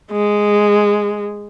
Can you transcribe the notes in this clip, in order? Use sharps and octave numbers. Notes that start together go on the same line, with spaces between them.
G#3